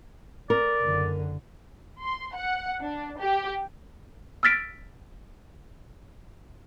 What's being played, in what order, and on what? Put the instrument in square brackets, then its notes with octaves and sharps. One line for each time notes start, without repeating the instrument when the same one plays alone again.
[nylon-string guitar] A#4 [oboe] D5
[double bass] F#1 D3
[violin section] C6
F#5
D4
G4
[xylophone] E6 F6 A6 B6 D7